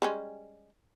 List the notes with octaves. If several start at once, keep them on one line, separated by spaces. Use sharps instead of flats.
G3 G#3 C#4